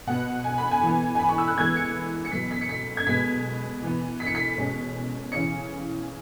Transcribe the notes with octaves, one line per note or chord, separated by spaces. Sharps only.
B2 B3 F#5
G#5
B5
G#5
E3
B3
G#5
B5
C#6
E6
F#6
E3 G#3 B3 G#6
C#7
C#7
B2 F#3 B3 B6
B6
C#7
B6
G#6
B2 G#3 B3 B6
E3 B3
B6
C#7
B6
B2 G#3 C#4
C#3 E3 C#4 C#7